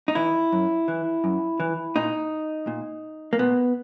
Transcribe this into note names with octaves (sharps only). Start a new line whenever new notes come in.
D#4
E3 E4
F#2
E3
F#2
E3
A#2 D#4
A#2
A#3
A#2 B3